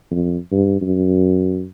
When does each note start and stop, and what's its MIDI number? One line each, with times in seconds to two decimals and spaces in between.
0.11 0.37 41
0.51 0.77 43
0.81 1.65 42